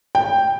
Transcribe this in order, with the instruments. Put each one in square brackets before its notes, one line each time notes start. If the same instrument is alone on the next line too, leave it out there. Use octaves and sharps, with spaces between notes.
[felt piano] G5